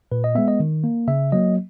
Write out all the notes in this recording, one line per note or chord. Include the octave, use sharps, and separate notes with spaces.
A#2 B4
D#5
G#3 B3 E5
D#5
D#3
A#3
C#3 E5
F#3 A#3 D#5